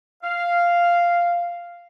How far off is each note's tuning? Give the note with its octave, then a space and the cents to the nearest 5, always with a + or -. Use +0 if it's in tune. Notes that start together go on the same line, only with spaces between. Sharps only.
F5 -5